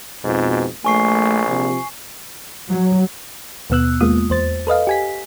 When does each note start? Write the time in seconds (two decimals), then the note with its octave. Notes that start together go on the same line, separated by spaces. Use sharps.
0.24 F2 G#2 B2
0.85 A#1 A3 G#5 C#6 C7
1.47 C3 F3
2.71 F#3
3.70 D#2 B2 B3 E6 F#6
4.01 D#2 G#3 A#3 B3 F4 D#6
4.30 E2 C5 A6
4.67 A4 B4 D#5 F5
4.87 G4 G#5 B6